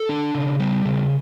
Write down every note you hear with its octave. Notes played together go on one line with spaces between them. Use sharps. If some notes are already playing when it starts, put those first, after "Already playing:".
Already playing: A4
D4
C#3
G3
C#3